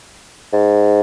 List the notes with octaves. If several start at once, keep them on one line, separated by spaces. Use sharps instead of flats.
G#2